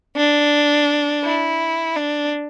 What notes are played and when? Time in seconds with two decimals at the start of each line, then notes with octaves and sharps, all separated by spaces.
0.16 D4
1.25 E4
1.96 D4